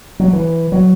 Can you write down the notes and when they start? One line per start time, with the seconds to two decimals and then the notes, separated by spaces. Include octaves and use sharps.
0.20 F#3
0.33 E3
0.72 F#3